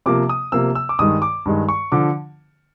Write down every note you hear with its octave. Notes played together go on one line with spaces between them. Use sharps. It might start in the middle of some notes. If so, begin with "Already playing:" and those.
C3 F3 A#3 D6
D#6
C3 F3 A#3 E6
E6
D6
G2 D#3 G#3 D#6
D6
G2 D#3 G#3
C#6
D3 F3 D6